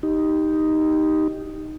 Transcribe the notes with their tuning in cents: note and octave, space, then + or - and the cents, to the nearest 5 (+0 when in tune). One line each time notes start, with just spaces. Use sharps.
D#4 +0 G4 +0